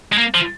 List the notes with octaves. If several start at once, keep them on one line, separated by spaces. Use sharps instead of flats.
G#3
A#3
F3